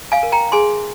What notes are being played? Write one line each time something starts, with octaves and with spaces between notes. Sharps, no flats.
F5 G#5
A#4
G5 A#5
G#4 G#5 C6